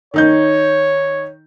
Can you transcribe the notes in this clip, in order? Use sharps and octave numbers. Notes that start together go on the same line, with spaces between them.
D#3 D#4 C#5 G6